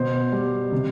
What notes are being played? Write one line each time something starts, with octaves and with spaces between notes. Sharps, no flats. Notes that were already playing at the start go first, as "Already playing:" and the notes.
Already playing: B2 C5
G3
C3